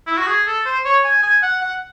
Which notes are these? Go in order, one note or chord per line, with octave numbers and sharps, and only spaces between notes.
E4
F#4
G#4
A4
C5
C#5
G#5
G#5
F#5
F#5